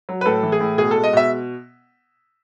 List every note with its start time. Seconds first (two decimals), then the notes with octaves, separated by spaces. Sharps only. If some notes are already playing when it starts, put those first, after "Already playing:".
0.09 F#3
0.21 B4
0.26 A2 A4
0.43 E3
0.52 G#4
0.60 A2
0.78 B2 G#4
0.91 G#3 A4
1.04 D#5
1.13 B2 E5